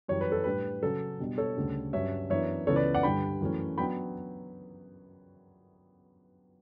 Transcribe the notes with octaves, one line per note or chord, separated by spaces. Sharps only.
F#2 E3 G3 C#5
B4
A4
A2 G3 D4 B4
C#3 F#3 C#4 A4
B2 G3 D4
A4 C#5
D2 C#3 G3 D4
G2 F#3 C#4 C#5 E5
F#2 E3 B3 D4 C#5 E5
C#2 C#3 E3 B3 A4 C#5
B4 D5
D5 F#5
G2 D3 G3 G5 B5
F#2 E3 A3 C#4
F#3 B3 D4 G5 B5